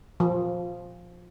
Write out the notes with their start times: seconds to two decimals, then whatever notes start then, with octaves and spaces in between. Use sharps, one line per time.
0.20 F3